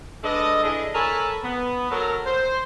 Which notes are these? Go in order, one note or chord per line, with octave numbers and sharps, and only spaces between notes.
G#3 D4 A4 B4 D#5
D4 E4 G#4 A4 D#5
A4 A#4 C#5 G#5 A5 B5
B3
F#3 A4 A#4
C5